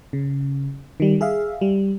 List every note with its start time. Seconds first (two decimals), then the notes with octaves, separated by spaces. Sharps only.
0.13 C#3
1.00 D#3 G3
1.21 G#4 E5 F5
1.61 G3